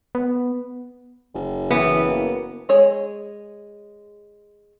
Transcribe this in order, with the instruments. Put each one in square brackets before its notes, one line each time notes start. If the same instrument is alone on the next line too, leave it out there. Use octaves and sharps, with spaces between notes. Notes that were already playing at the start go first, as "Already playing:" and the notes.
[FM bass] B3
[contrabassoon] F#1
[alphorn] E3 [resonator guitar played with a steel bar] B3
[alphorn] A#3
[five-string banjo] G#3 G#4 C#5